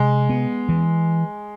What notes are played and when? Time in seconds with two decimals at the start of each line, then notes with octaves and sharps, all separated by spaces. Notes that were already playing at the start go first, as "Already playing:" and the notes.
Already playing: C3 G#3
0.30 B3
0.69 E3